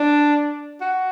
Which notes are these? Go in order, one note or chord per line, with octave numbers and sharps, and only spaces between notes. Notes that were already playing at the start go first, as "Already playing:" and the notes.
Already playing: D4
F#4